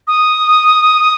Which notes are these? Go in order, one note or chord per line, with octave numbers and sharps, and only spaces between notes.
D#6